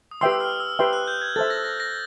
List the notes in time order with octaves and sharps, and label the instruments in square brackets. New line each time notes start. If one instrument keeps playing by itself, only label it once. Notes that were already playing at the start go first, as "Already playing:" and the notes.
[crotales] D#6
[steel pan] G4 B4 E5 G5 C6 [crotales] E6
[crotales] F6
E6
[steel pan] G4 B4 E5 G5 C6
[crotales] F#6
G6
G#6
[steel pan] A4 C5 E5 [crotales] A6
[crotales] A#6
A#6
A#6